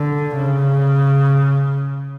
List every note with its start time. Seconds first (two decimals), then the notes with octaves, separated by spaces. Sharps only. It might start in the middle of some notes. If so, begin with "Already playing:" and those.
Already playing: D3
0.36 C#3